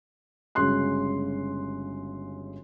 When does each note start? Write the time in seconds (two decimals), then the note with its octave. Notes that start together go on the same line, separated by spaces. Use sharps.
0.55 G1 C#3 G#3 F#4 C6 F#6